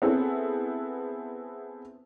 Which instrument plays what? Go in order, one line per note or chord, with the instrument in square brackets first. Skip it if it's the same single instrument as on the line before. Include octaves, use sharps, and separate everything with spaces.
[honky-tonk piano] B3 C4 E4 G#4 A4